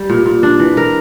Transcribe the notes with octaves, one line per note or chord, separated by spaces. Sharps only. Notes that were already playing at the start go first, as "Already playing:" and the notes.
Already playing: G3
A#2
A#2
D4
E3
A#4